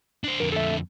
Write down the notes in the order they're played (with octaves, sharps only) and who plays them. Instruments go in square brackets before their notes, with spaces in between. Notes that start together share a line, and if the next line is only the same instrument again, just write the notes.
[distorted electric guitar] D4 C5
[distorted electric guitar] F2 D3 [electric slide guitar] A#4
[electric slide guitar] A4 E5